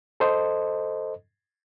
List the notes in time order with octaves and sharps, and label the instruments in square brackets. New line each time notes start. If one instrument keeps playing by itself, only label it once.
[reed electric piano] A4 C5 D#5